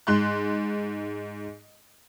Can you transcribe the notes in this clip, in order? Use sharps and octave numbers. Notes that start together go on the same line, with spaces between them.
G#2 C6 F#6